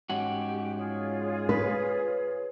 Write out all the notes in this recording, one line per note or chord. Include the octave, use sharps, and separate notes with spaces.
G#2 C#4 F#4 G4
F4 G#4 C#5
B4